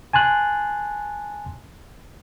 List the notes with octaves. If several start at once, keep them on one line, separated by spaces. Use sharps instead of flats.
G#5 A5 C6 F#6